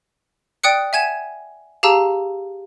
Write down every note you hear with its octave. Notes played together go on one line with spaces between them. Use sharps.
D5 G5 D#6 F#6 C#7
E5 F#5 G#5 G#6 D#7 E7
G4 G#4 F5 A5 A#5 E6